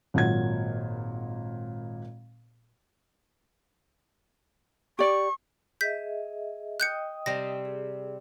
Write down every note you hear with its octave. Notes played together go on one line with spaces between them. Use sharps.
G#1 A#2 F#3 G#6
G4 D5 C#6
G#4 D#5 E5 G6 B6
D#5 G5 D#6 F#6 G6 C#7
C3 G3 C4 A#6
G#4